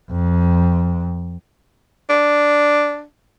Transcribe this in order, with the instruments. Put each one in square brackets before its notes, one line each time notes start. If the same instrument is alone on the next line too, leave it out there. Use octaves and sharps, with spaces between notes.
[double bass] F2
[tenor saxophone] D4